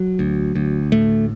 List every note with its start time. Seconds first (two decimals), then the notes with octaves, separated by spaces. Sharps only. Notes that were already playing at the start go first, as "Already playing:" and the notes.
Already playing: F#3
0.19 D2
0.55 D2
0.92 A2 A3